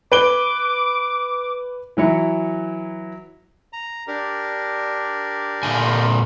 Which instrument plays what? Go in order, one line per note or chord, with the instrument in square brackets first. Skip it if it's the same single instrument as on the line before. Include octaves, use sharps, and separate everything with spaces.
[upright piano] B4 D7 G7 [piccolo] D6
[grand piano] E3 F#3 E4 C#7
[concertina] A#5
D4 G4 A#4
[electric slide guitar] A#2 D3 G#5